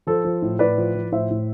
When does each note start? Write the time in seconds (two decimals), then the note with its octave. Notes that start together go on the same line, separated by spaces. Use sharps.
0.07 F3 A4 C5
0.25 F3
0.42 A2
0.59 A2 B4 D5
0.78 F3
0.95 F3
1.12 A2 C5 E5
1.30 A2